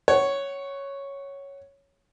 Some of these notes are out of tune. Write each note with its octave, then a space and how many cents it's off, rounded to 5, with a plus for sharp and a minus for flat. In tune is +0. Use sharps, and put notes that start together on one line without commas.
C#5 +0 F#5 +25